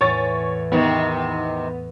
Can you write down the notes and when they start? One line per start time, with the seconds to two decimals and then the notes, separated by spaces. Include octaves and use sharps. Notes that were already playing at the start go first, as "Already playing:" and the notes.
0.01 E2 A2 C#5 G#5 C#6 A6
0.72 C3 D#3 B3